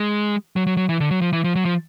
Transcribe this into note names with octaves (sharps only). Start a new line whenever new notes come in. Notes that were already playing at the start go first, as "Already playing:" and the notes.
Already playing: G#3
F#3
F#3
F#3
E3
D3
F#3
F3
E3
F3
F#3
F3